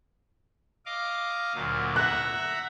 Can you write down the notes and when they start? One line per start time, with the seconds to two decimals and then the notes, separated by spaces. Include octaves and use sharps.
0.86 D#5 F5 D6
1.55 D2 A#2 F#3
1.96 E5 F#5 A#5 F#6